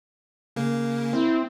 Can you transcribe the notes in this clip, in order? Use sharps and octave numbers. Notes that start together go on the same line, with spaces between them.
C#3 A#3
C4 E4